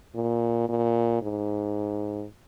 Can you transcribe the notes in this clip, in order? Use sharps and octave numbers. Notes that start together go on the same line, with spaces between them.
A#2
A#2
G#2